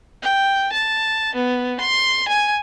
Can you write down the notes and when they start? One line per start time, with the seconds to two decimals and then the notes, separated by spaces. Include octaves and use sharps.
0.23 G5
0.72 A5
1.35 B3
1.80 C6
2.28 G#5